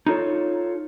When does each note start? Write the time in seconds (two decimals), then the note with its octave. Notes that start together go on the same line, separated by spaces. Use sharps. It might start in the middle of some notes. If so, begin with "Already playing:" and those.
0.06 D#4 F4 A4 C#5